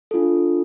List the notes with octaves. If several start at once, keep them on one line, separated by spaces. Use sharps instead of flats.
D4 F4 A4